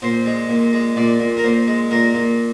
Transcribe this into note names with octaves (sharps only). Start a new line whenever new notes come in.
A#2 C5
G#3
A#2
G#3
A#2 D5
A#2
A#4
A#2 C5
G#3
A#2 A#4
A#2